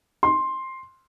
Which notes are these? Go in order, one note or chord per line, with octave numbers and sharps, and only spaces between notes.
C6